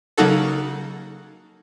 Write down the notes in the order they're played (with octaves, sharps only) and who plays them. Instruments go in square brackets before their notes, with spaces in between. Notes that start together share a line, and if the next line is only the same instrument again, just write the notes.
[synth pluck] C#3 F#3 A#3 D#4 F#4 A4